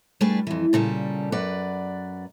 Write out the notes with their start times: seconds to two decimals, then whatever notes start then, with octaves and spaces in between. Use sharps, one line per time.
0.21 G3 A3 D4 G#4 B4
0.47 F2 E3
0.73 A#2 C#3 G3 A4
1.32 F#2 B4 D5 F#5